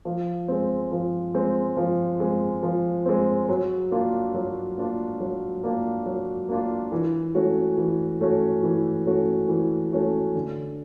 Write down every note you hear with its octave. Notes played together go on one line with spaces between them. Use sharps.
F3
G#3 C4
F3
G#3 C4
F3
G#3 C4
F3
G#3 C4
F#3
A#3 D4 F4
F#3
A#3 D4 F4
F#3
A#3 D4 F4
F#3
A#3 D4 F4
E3
A3 C#4 F#4
E3
A3 C#4 F#4
E3
A3 C#4 F#4
E3
A3 C#4 F#4
D3